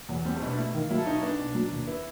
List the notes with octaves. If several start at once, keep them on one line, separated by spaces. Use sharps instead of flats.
E2 F#3
G3 C4
A3
B2
D4
A3 E4
D#3 F4
F#3 E4
A4
B1 D#4
C#4
B3 D4
B2
F#3
D#2
B3 E4